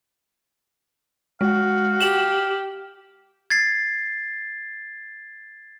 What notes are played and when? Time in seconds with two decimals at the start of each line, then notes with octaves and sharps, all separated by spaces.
1.41 G#3 F#4 F5
2.01 G4 E7 F#7
3.50 G#6 A6 C7